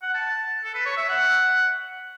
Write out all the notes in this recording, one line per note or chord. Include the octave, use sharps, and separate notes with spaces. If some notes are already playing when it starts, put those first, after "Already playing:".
F#5
A5
A4
B4
C#5
E5
F#5